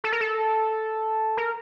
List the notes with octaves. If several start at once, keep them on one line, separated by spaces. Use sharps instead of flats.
A4
A#4
A4
A#4